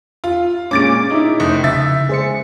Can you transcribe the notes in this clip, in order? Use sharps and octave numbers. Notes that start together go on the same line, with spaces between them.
F4
A#2 G#3 C#4 D6 A6 D7
D#4 E4
F1 D#6 G6
C#3 E5 A6
G#3 G#4 C5 C#7